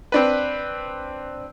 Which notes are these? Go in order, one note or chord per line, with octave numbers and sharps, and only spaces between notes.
C4 D4 B4